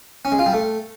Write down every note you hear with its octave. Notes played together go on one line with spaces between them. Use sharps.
C#4
G#3
F4
G3
A3